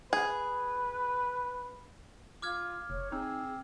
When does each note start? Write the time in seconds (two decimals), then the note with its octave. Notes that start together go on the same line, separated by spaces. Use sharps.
0.13 G#4 B4
2.42 F4 D6 F6 G#6
2.90 F1 C#5
3.12 C4 D#4 G#4